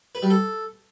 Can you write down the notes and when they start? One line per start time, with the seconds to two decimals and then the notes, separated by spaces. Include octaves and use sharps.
0.15 B4
0.23 G3
0.30 A4